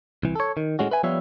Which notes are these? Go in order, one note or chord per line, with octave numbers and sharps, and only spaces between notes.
C2 E3
A4 C#5
D#3
A2 G#3 C#4 F#4
B4 E5 G#5
F3 G3 B3 F4 C#5 E5